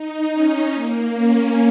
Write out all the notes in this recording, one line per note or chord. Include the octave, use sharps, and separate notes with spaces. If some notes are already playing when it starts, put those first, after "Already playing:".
Already playing: D#4
C#4
A#3
C#4